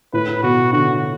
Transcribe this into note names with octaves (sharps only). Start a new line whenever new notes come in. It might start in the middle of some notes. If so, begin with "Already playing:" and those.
A2 B4
B2 F#4
D3 F#4